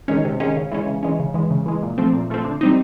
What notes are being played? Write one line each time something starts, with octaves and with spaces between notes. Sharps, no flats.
D#3 G#3 C#4
C3
D#3 G#3 C#4
C#3
E3 G#3 C#4
C#3
E3 G#3 C#4
C#3
E3 G#3
C#3
E3 G#3
A#2
F3 A3 C4
A#2
F3 A3 C4
D3
G3 C4 D#4